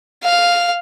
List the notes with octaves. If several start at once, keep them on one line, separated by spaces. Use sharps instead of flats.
F5